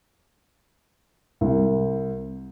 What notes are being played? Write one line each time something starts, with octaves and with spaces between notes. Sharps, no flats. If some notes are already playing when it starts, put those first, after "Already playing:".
C2